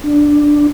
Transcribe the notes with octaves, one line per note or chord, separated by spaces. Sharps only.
D4